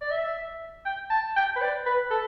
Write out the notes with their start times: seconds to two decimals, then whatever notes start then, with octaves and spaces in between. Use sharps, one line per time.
0.01 D5
0.11 E5
0.86 G5
1.10 A5
1.36 G5
1.56 B4
1.61 D5
1.86 B4
2.10 A4